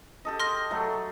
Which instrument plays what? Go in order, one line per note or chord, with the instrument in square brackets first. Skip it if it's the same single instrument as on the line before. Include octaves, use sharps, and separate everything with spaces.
[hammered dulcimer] G4 A4 D#5
[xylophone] C6 F6 A#6
[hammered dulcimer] F#3 A3